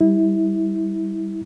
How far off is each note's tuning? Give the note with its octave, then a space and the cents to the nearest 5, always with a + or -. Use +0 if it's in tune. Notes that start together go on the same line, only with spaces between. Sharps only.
G3 +0 E4 -25